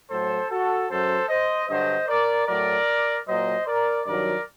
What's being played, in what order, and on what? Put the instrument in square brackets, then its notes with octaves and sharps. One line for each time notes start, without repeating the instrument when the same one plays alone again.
[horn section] A2 F#3 A4 C5
F#4 A4
F#2 F#3 A4 C5
C5 D#5
G2 D3 F#3 C5 D#5
A#4 D5
A2 F#3 A#4 D5
A#2 F#3 C5 D#5
A#4 D5
G2 D#3 F#3 A#4 D5